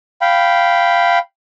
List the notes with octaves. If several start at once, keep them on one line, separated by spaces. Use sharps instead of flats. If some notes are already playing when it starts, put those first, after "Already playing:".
F5 G5 B5